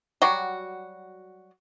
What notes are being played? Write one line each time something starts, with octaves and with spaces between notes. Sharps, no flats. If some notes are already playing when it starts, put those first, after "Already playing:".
F#3 G3 F#4